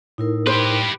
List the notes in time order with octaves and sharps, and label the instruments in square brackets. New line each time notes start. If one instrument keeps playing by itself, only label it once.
[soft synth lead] A2 [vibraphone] D#4 E4 A#4
[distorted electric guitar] G4 B4 [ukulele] C5